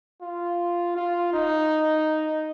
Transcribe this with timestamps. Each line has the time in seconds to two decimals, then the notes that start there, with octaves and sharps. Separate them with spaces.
0.21 F4
0.96 F4
1.33 D#4